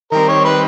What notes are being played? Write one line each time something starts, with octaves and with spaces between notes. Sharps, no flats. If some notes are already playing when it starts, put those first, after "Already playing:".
D#3 G3 C4 A#4
C#5
B4